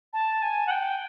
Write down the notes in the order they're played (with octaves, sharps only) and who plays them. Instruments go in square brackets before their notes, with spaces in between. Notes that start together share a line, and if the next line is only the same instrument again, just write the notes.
[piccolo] A5
G#5
F#5
G5